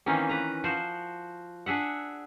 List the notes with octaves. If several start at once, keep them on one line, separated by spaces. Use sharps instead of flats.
D#3 E3 A#3 C4 C#4
B4 A#5
F3 F#4 C5
D4 G#4 E5 F#5